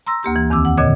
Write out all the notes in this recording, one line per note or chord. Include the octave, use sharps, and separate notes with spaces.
A#5 C6 E6 A#6
D2 A#3 G4 C6
E3
E2 D#3 C4 D6 E6
F#5
A#2 D3 C#5 D#5 G#6